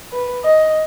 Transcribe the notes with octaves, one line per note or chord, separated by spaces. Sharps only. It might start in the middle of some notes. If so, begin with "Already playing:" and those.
B4
D#5